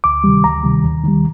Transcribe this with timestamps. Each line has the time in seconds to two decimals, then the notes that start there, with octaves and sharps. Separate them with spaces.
0.04 D2 D6
0.24 C3 D#3 G3
0.44 D2 A#5
0.64 C3 D#3 G3
0.84 D#2
1.04 D#3 G3